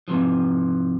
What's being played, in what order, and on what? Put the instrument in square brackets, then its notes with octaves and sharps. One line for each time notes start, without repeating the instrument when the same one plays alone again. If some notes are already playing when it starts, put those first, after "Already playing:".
[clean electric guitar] G#2 C3 E3 F3